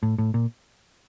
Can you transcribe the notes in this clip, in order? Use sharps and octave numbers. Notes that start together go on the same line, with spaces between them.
A2
A2
A#2